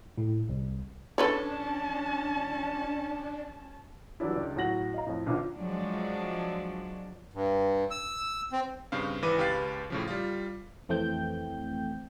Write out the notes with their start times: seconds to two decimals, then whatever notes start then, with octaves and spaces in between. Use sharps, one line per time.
0.18 A2
0.49 C2
1.18 C#4 D4 A4 B4 C#5 A5
4.20 E3 F#3 G3 D4 E4
4.33 C#2 G2 D5
4.56 A2 F#3 F#4 A#6 F#7
4.94 D#5 F5 A#5
5.07 F2 A2
5.26 B1 F#2 A#2 D3
5.56 F3 F#3 G#3 D4
7.34 G2
7.91 E6
8.52 C4
8.92 G2 C#3 C4 F5
9.22 G#1 E3 B4 D6 D#7
9.38 C#2 G4 B4 F5 A6
9.90 A2 C#3 F3
10.08 G3 F4
10.89 F2 E3 A3 C4 G5 G6